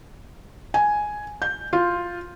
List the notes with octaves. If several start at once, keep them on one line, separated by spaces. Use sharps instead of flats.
G#5
G6
F4